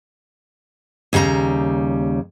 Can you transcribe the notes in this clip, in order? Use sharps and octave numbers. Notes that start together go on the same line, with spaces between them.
D#2 C#3 G3 A#4 A#5